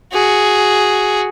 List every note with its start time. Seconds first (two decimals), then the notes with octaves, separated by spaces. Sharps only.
0.13 F#4 G#4